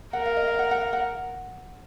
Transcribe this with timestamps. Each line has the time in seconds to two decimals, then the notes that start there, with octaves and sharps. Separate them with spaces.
0.13 A#4 F#5
0.26 F5
0.37 D#5
0.47 F5
0.59 F#5
0.71 F#5
0.81 F5
0.93 F#5